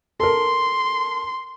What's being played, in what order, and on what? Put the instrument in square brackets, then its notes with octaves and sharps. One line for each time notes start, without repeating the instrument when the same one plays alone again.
[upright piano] A4 A#4 [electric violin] C6